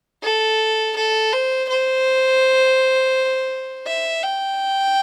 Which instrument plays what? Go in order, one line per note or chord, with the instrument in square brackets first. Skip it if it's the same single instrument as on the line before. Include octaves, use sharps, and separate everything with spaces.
[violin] A4
A4
C5
C5
E5
G5